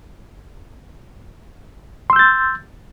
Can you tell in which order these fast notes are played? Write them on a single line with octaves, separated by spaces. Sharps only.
C6 E6 G6 A6